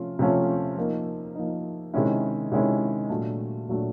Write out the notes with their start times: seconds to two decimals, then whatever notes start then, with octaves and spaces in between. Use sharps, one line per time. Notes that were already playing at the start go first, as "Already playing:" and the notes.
Already playing: C3 F3 A3 C#4 F4
0.19 C3 F3 A3 C#4 F4
0.77 F3 A#3 D#4
1.35 F3 A#3 D#4
1.94 C3 D#3 G#3 C#4 E4
2.52 C3 D#3 G#3 C#4 E4
3.10 A#2 F#3 A3 D4
3.68 A#2 F#3 A3 D4